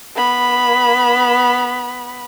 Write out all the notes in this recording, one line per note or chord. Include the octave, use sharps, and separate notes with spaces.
B3 B5